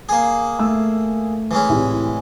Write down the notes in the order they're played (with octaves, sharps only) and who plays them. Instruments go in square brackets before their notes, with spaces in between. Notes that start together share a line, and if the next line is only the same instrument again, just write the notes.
[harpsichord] A#3 G#4
[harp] A3 [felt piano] E6
[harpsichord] E3 G#3 C#4
[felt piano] C2 A2 G4